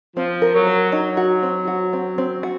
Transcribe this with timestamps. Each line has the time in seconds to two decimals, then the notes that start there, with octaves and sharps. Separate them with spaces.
0.16 F3 C4
0.42 A#4
0.54 F#3
0.67 A#4
0.92 F#3 D#4
1.17 F#4
1.43 C4
1.68 F#4
1.93 C4
2.18 C4
2.43 F#4